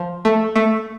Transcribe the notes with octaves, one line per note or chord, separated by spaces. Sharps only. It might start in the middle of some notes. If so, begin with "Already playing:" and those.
Already playing: F3
A3
A3